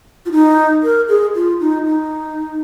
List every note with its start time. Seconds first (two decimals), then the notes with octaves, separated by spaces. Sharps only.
0.26 F4
0.32 D#4
0.83 A#4
1.08 G#4
1.35 F4
1.60 D#4
1.86 D#4